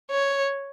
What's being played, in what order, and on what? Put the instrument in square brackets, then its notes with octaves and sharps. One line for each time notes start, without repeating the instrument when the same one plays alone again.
[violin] C#5